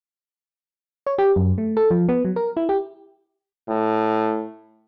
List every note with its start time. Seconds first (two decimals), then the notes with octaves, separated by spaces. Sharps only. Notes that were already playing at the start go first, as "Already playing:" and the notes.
1.07 C#5
1.18 G4
1.36 F#2
1.58 A3
1.77 A4
1.91 F3
2.09 B3
2.25 F#3
2.36 A#4
2.57 E4
2.69 G4
3.69 A2